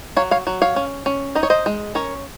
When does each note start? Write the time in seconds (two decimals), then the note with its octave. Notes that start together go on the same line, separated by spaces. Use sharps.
0.17 F#3 C#5 F5
0.31 C#5 F5
0.47 F#3
0.62 C#5 F5
0.76 C#4
1.06 C#4
1.35 D#4 D#5
1.43 C#5
1.50 C5 D#5
1.66 G#3
1.95 C#4 A#4 C#5